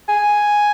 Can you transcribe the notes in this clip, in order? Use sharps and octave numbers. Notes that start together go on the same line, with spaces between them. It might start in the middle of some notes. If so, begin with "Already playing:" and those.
G#5